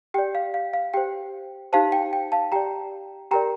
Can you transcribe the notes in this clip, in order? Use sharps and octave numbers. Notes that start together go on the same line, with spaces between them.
G4 D5 G5
F5
F5
F5
G4 C5 G5
D#4 G4 C5 F5 A5
G5
G5
F5 A5
G4 D5 G5 A#5
G4 A#4 D5 G5 A#5